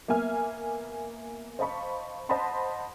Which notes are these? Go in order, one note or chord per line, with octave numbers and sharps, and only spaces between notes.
A#3 B3 E5 G#5 F6
C5 D#5 F5 A5 B5 C#6
C5 D#5 F#5 A5 B5 C6